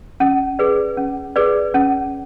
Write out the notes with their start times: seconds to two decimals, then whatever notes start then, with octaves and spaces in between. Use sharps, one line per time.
0.20 C#4
0.59 G#4 B4 D5
0.97 C#4
1.36 G#4 B4 D5
1.74 C#4